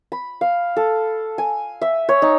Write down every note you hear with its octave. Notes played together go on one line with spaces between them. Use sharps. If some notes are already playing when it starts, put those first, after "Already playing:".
B5
F5
A4
G#5
E5
C#5
D#4